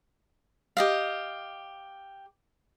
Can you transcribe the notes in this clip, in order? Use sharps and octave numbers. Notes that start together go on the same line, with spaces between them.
G4 D#5 F5